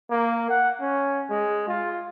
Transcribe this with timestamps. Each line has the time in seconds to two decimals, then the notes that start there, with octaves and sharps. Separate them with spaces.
0.11 A#3
0.49 F#5
0.81 C#4
1.29 G#3
1.68 F4